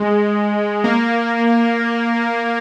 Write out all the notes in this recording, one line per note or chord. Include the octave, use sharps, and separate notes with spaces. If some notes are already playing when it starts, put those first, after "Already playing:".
Already playing: G#3
A#3